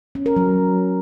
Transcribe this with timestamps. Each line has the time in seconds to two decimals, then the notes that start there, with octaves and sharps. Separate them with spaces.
0.15 C#4
0.26 A#4
0.36 F#3